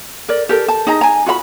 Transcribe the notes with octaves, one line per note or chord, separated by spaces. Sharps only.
A#4 D5
G4 A4 A#4
A5
D#4 G#4 D#5 A#5
G#5 A#5
F4 F#4 E5 B5